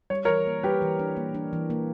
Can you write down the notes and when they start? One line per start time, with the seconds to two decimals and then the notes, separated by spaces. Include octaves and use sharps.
0.10 G3 C#5
0.25 E3 A#4 C#5
0.46 A#3
0.63 G3 G4 B4
0.82 E3
0.99 D4
1.17 A#3
1.34 D4
1.53 E3
1.70 A#3